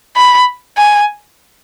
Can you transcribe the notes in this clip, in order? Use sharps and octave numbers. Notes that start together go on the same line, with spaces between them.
B5
G#5